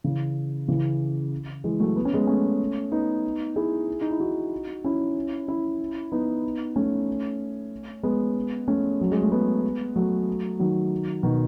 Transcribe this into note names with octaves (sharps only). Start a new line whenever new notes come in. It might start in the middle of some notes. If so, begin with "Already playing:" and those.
C#3 E3
C#3 E3
E3 G#3
F#3 A3
B3
C#4
G#3 B3
A3 C#4
B3 D#4
E4 G#4
D#4
E4
D#4 F#4
C#4 E4
C#4 E4
B3 D#4
A3 C#4
G#3 B3
A3 C#4
F#3
G#3
A3
G#3 B3
F#3 A3
D#3 F#3
B2 D#3